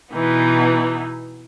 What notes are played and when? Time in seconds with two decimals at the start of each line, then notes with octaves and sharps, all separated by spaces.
0.12 B2 E3 B3 D#4